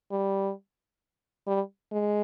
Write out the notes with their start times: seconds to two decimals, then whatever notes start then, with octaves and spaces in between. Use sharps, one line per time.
0.11 G3
1.47 G3
1.92 G#3